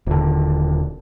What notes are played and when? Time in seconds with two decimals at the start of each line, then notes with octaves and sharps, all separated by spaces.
0.07 D#1 D3